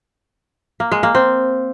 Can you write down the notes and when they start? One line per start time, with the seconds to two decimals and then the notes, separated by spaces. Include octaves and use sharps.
0.80 A#3
0.92 G#3
1.03 A#3
1.15 C4